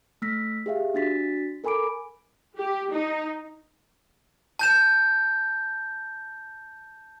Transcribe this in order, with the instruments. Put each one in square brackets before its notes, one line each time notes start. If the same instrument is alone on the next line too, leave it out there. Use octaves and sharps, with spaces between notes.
[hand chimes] A3 E6 F6 A#6 B6
G4 G#4 E5 F5
D4 F#4 A6 B6
A4 A#4 G#5 B5 D6 D7
[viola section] G4
D#4
[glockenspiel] A5 G6 E7